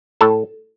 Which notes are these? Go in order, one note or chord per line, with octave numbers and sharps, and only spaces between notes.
A2 A4 A5